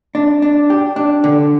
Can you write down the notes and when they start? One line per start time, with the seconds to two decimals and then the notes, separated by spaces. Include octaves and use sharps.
0.15 D4
0.42 D4
0.70 G4
0.96 D4
1.24 D3